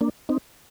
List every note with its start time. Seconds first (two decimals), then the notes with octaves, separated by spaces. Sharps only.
0.01 A#3 D4
0.29 C4 D#4